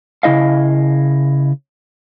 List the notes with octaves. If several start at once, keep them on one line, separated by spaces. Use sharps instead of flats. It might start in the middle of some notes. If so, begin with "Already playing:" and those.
C#3 B3 E4 D#5 F5